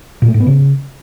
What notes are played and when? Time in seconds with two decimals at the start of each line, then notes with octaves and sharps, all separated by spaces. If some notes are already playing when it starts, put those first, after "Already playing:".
0.22 A#2
0.28 A3
0.34 G#2
0.40 B3
0.46 C#3